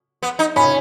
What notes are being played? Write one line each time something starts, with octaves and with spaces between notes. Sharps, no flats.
B3
D#4
C#4 B5